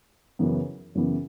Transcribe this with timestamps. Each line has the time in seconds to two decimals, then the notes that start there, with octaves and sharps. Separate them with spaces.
0.39 F#2 C#3 E3 B3
0.95 F#2 C#3 E3 B3